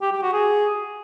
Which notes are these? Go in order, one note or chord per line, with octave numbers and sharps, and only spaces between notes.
G4
G4
F#4
G#4